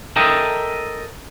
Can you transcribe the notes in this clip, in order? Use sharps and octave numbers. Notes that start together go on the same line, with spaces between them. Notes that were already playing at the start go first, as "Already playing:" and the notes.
A4 A#4 D#5 E5 G5